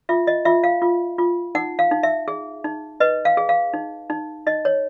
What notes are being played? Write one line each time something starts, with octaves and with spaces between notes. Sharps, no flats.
F4 E5
D#5
F4 E5
F5
F4
F4
D#4 F#5
F5
D#4
E5
G#4
D#4
B4 D#5
F5
G#4
F5
D#4
D#4
D#4 D#5
C#5